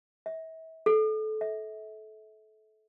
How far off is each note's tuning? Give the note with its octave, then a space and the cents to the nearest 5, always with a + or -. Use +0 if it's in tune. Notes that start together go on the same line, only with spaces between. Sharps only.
E5 -35
A4 -25
E5 -35